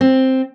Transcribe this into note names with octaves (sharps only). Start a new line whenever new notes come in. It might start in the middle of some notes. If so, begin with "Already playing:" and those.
C4